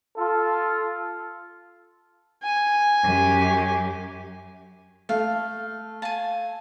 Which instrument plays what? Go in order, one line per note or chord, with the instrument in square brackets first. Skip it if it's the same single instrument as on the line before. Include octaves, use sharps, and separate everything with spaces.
[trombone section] F4 A4
[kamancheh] G#5
[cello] F#2 G4
[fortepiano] A3 [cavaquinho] F5
[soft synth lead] F5 [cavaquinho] G#5 A5